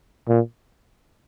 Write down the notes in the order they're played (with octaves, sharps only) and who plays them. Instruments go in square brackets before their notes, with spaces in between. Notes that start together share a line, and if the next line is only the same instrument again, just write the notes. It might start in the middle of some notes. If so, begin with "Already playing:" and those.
[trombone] A#2